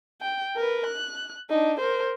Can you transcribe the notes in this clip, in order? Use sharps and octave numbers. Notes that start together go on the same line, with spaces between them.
G5
A#4 B4
F#6
D4 D#4
A#4 C5